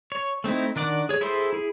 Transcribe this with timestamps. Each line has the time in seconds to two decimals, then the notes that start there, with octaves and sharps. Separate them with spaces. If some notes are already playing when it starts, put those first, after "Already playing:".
0.12 C#5
0.44 A3 C4 D#4 E4
0.76 D#3 D4 D5 F#5 D6
1.09 G#4 C#5
1.21 E4 G#4 A4 C5 C6
1.53 E4 G#4